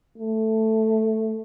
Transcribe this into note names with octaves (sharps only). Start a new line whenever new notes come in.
A3